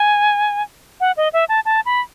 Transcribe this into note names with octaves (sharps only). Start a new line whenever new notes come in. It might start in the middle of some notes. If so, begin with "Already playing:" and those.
Already playing: G#5
F#5
D#5
E5
A5
A5
B5